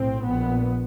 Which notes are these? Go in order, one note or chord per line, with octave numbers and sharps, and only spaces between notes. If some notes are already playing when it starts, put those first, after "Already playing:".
Already playing: B1 A2 C4
A#1 A#2 B3